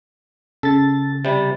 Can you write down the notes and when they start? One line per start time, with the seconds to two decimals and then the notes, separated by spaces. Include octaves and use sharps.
0.63 C#3 A4 A6
1.25 C3 G3